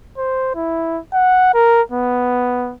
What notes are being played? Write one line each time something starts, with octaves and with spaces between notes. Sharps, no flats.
C5
E4
F#5
A#4
B3